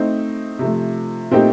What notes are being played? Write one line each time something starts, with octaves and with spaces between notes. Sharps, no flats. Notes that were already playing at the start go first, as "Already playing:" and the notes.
Already playing: A3 C4 D#4
C3 F3 A3
A#2 A3 C4 D#4 G4